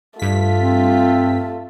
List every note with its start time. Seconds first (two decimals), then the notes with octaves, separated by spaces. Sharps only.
0.19 G2 A3 F4 B6
0.59 C4